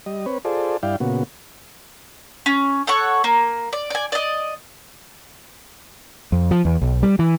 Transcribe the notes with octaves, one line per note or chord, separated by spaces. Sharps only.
G3 D#5
C4 B4 C#5
F4 G#4 A4 C5 D5
G2 E4 D5 F5 G5
A#2 C#3 B3 F#4
C#4
A4 C#5 F#5 C#6
A#3
D5
D5 G#5
D5 D#5
F2
F3
E2
B1
G3
E3